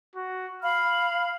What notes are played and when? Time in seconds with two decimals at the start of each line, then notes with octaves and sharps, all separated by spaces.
0.15 F#4
0.62 F5 B5 F6